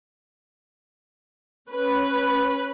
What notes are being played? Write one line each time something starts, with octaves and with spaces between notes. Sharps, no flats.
C#4 B4